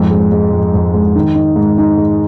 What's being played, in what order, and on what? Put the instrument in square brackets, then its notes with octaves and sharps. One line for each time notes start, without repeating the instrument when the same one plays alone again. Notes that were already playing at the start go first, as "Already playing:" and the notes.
Already playing: [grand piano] F2 G#2
G#3
G#3
F2
F2
G#3
D#3
D#4
G#2
D#4
G#3